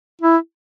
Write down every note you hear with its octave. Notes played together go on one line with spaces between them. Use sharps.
E4